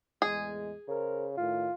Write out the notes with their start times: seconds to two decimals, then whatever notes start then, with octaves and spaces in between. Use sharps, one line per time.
0.22 E2 A2 G#3 G#4
0.88 C#3 A#4 C5
1.37 A2 D#3 F4